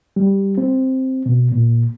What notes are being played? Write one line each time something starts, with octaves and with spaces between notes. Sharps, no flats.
G3
C4
B2
A#2